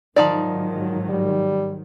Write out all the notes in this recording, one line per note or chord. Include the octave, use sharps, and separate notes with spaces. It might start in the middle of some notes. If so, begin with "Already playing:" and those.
G#2 D#3 F3 F#3 D#4 D5
G3